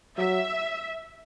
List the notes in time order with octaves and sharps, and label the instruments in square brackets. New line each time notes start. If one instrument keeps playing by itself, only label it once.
[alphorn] F#3 [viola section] E5